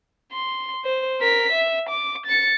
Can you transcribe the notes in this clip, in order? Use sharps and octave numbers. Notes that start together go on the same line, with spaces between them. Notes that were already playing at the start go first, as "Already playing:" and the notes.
C6
C5
A#4 B6
E5
D6
A6 C#7